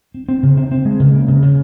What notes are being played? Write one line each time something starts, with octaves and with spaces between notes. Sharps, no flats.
C4
C4
C#3
C4
C4
G#3
C#3
A#3
C#3
C#3